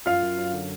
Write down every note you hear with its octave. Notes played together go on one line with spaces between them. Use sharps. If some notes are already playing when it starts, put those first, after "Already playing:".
F#2 F4 F5
F#2
F#3
D3